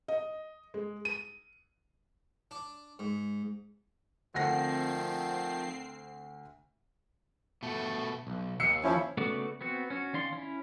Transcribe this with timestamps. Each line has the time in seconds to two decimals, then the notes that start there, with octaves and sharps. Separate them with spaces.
0.08 D#5
0.74 G#3
1.05 D#7
2.51 D4
2.99 G#2
4.34 D2 D#3 F3 C4 F#5 A#6 C7
7.63 B2 A3
8.27 B1
8.60 D#2 E6 C7 C#7
8.84 F3 C#4 E4 C#5 B5
9.17 C#3 A3 B3 F#4 D5
9.61 B3 C4 F#4
9.90 C#4 F#4
10.13 D#3 C#4 D5 F5 C6
10.33 C#4 E4